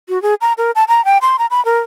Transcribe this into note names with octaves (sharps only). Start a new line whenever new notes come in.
F#4
G#4
A#5
A#4
A5
A#5
G5
C6
A#5
B5
A#4